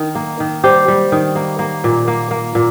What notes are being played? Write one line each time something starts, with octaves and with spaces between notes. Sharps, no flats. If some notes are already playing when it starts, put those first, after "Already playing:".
Already playing: D#3
A#3
D#3
G3 G4 C5
G3
D#3
A#3
A#3
A#2
A#3
A#3
A#2